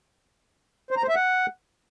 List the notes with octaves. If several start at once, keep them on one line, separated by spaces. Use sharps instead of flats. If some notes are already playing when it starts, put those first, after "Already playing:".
C5
A#5
C5
E5
F#5